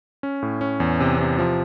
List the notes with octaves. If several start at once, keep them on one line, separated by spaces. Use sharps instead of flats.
C#4
A2
C#4
E2
C3
C3
F3